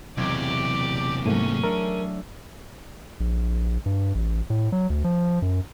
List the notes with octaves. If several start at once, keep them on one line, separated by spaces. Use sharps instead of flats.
E1 E2 C3 F#3 G4 D5 G#6
G#2 F#3 A3 A#3 C#4 G#4 D#7
A3 D4 A#4
A#1
G2
A1
A2
F#3
D2
F3
F#2